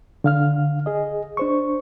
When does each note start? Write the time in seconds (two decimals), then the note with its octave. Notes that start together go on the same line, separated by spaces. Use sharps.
0.24 D3 F5 F6
0.86 G#4 D#5
1.37 D4 C5 C#6